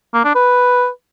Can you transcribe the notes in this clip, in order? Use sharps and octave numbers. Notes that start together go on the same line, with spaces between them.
A#3
D4
B4